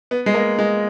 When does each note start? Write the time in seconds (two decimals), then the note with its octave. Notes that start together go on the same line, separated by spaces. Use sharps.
0.11 B3
0.26 G#3
0.34 A#3
0.59 G#3